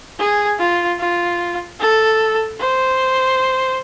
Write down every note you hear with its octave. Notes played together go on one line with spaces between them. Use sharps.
G#4
F4
F4
A4
C5